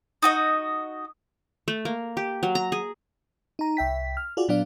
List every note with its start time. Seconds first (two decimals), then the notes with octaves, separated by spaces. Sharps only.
0.23 D#4 F#4 D#5
1.68 A3
1.85 A#3
2.17 G4
2.43 F#3
2.55 A#5
2.72 G#4
3.59 D#4 A#5
3.77 C2 E5 G5 B6
4.17 F6
4.37 F4 F#4 G#4 D5
4.48 A#2 F#3 B3 D4 D5 F5